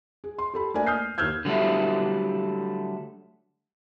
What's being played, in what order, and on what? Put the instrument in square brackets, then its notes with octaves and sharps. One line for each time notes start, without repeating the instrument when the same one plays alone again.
[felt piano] G#4
C6
G4 A4 B5
A3 A#3 D4 A#4 G#5
D#6 F6 G6 C7
D#2 E6 F6 G6 G#6
[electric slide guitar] D3 F#3 G3 A3 E4